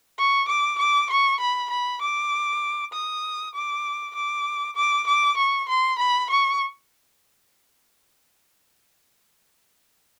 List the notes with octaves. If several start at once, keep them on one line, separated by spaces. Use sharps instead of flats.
C#6
D6
D6
C#6
B5
B5
D6
D#6
D6
D6
D6
D6
C#6
C6
B5
C#6